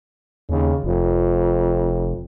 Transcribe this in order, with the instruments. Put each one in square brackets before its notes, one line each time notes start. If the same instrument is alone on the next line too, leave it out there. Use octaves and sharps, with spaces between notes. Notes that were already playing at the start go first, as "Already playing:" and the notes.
[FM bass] D#2 [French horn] C#3
[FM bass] F1 [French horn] F2